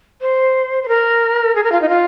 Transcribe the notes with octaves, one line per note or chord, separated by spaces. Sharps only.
C5
C5
A#4
G#4
A#4
F4
D#4
F4